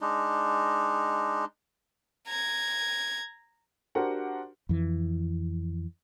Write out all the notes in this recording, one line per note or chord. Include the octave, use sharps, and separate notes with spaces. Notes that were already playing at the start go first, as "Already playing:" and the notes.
G#3 D4 D#4
A#5 G#6
D4 F#4 G4 A#4 C5 F#5
F2 E3